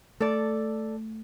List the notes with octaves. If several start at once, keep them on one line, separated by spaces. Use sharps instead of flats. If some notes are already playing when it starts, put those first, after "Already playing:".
A3 A4 D5